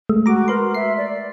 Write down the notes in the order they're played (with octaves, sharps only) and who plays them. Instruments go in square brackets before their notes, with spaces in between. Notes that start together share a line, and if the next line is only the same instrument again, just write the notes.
[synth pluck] G#3 A3
[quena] F#4 [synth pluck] A#5 D6
[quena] A#4 [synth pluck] B4 C6
[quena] E5 [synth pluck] C7
[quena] D5